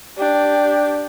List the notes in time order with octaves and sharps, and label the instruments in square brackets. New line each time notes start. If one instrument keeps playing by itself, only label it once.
[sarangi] D4 [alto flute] G4